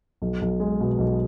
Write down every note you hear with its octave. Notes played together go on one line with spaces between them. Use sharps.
B1
B1
G#3
B2
B1